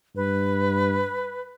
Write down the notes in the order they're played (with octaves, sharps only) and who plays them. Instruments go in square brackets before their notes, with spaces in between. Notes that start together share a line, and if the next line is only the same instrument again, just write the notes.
[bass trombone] G2 [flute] B4